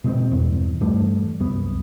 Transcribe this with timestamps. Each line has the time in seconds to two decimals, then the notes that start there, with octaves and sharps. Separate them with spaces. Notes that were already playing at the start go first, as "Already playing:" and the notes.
0.04 B2 G#3 A3 C4
0.31 G1 E2
0.81 G2 E3 G3 A3
1.40 C2 F#2 B3